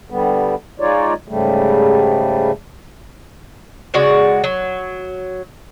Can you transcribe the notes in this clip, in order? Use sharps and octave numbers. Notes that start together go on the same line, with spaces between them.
D3 G3 B3
G#3 D#4 F4 C#5 D5
G#2 C#3 G3 A3
C#3 G#3 F#4 D5
F#3